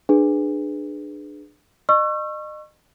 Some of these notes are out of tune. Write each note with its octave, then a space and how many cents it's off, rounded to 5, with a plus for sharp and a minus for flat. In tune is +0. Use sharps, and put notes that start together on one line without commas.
D4 +25 G#4 +0 B4 +0
D#5 -35 C#6 -20 E6 +40